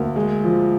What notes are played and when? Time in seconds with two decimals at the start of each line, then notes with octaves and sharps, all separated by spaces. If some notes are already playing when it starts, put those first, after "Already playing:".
Already playing: D2 A#3
0.16 G#3
0.44 F3